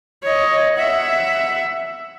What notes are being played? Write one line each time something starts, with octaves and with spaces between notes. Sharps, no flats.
C#5 D#5
E5 F#5